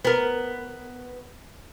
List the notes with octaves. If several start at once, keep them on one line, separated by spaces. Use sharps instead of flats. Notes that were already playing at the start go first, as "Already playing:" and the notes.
B3 A#4